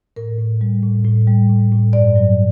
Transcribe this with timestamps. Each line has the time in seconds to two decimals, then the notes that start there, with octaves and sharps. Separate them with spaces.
0.16 A2 A#4
0.39 A2
0.61 G3
0.83 A2
1.04 A2
1.27 G3
1.49 A2
1.72 A2
1.93 G2 D5
2.16 F#3